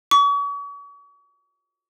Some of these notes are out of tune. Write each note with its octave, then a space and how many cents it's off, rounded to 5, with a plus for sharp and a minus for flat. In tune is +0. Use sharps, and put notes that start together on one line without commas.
C#6 +40